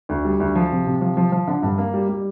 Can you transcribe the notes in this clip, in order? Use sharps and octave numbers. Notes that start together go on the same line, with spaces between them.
D2
G3
D2
F3
C3
C3
F3
F3
F3
D3
G2
A#3
G3
G3